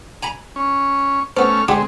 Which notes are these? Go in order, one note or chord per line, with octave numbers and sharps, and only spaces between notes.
G#5 A#5 B5
C#4
A3 B3 C#4 C5 F6
D3 G#3 A3 C4 G4